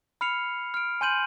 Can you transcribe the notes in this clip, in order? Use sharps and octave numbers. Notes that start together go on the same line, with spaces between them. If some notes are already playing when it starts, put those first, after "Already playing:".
B5 F6 C7 C#7 F7
F6 D7
G#5 C6 G6 D#7 F#7